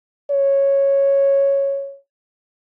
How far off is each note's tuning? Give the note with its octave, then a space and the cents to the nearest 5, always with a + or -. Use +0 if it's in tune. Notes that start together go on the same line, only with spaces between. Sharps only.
C#5 -5